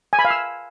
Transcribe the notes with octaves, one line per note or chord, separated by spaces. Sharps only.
G#5
B5
F5
E6